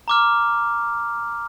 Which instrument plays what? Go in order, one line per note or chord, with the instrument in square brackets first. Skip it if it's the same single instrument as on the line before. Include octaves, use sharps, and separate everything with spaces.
[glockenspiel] A#5 D6 F6